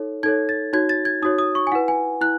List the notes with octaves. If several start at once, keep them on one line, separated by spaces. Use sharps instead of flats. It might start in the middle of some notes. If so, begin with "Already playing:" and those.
Already playing: D#4 A4 C#5
D#4 A4 C#5 G#6
A6
D#4 F#4 C#5 G#6
A6
G#6
D#4 F#4 C#5 D#6
D#6
C#6
G#5
E4 B4 F#5
G#5
E4 F#6